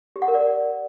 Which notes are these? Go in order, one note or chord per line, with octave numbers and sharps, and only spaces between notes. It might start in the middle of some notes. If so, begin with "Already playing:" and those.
G4
F#5
A#4
D5